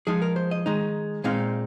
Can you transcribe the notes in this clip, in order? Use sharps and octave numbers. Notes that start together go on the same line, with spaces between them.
F3 G#3 D#4 G#4
A#4
C5
D#5
D#3 G#3 D#4
A#2 G#3 C4 D#4 F5